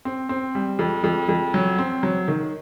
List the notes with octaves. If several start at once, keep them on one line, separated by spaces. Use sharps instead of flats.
C4
C4
G3
F2
F2
F2
F#3
C4
F#3
D#3